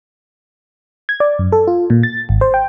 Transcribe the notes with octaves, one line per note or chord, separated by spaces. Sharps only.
G#6
D5
F#2
A4
F4
A#2
A6
G#1
C5
G5